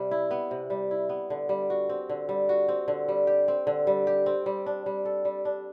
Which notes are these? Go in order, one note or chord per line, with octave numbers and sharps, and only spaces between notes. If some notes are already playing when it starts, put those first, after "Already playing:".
Already playing: C3 G3
E4
B3
C3
G3
E4
B3
D3
G3
F#4
C4
D3
G3
F#4
C4
D3
G3
G4
C4
D3
G3
G4
C4
G3
D4
G3
A4
G3
D4